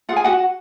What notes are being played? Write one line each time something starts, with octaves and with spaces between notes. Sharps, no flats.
F4 G#4 F#5 G#5
F#4 F#5